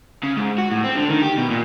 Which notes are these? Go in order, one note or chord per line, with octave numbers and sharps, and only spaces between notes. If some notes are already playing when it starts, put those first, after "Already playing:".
C#3
G#2
F#4
A2
C4
D3
D#3
G4
B2
A#2